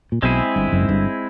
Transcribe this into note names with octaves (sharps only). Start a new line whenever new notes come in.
A#2
B1 B2 G#3 C4 E4 G#4
G1 G2
F#1 F#2
G#2
G1 G2